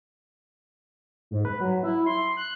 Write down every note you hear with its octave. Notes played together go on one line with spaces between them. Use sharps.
G#2
B4
F#3
E4
C6
F#6